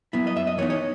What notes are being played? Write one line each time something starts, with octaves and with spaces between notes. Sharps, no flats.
F#3 B3 E4
D#5
F#2 E5
D#5
E3 B3 D#4 C#5
C#5